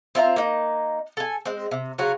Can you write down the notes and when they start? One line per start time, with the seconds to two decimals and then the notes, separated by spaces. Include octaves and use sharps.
0.15 C4 F4 E5 A#5
0.36 A#3 D#4
1.17 A4 G#5
1.46 G#3 C4
1.71 C3
1.98 C#3 F#3 F4 F#4